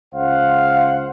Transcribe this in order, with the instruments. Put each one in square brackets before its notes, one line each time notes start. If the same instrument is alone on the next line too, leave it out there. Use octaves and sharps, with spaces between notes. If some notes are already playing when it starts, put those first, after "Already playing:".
[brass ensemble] C#2 C5 F#5 [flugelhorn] F5